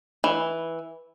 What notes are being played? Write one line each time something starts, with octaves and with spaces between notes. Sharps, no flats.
E3